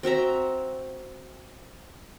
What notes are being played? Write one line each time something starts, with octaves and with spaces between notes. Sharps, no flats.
C4 F#4 E5 A#5